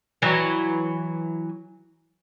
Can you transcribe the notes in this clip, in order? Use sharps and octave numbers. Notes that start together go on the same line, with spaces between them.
E3 F#3